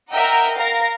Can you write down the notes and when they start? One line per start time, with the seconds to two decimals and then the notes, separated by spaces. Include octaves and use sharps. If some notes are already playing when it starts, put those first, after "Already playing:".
0.12 A#4 D#5 E5 F#5 G5 A#5
0.57 A#4 F5 A#6